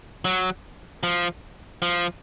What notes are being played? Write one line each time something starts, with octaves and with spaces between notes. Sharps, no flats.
F#3
F3
F3